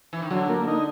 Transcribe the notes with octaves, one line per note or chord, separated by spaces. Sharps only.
E3
D#3
D3 F#3
A#3
D#4